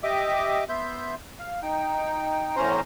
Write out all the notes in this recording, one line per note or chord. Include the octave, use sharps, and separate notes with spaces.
G4 D#5 E5 D6
B3 E5 C6 G6
F5
D#4 G5
E2 A2 C#4 C5 A#5 C6